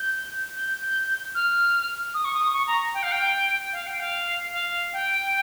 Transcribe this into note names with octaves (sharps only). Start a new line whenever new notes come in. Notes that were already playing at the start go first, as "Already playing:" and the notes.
Already playing: G6
G6
F6
D#6
C#6
D#6
C#6
A#5
G5
F5
G5
F5
G5
F5
F5
G5